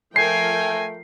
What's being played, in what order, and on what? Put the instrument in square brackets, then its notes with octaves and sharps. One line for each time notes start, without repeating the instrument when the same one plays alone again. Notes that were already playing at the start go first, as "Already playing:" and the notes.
[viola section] F3 A#4 G5 [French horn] A3 [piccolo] G#5 [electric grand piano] C7